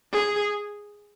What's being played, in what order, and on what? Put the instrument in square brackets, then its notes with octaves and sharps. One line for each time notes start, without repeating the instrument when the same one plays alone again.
[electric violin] G#4